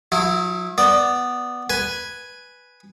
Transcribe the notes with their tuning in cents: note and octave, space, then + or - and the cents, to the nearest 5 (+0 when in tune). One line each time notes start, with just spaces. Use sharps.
F#3 -45 E4 +0
B3 +0 D5 +5
B4 +0 G#5 +0